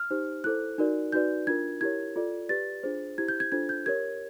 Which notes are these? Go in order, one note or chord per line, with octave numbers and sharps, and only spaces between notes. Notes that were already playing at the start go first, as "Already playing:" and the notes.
Already playing: F6
D#4 G4 C5
E4 A4 C5 F#6
D#4 F#4 A#4 D5
D#4 F#4 B4 D5 G6
D4 F4 A#4 G#6
E4 G4 A#4 C#5 G#6
F4 A4 D5
G4 B4 D5 A6
D4 F4 G#4 C5
E4 G4 C5 G#6
G6
G#6
D4 F4 A4 C5 G#6
G6
G4 A#4 C#5 G#6